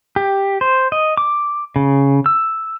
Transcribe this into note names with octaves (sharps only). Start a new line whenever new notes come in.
G4
C5
D#5
D6
C#3
E6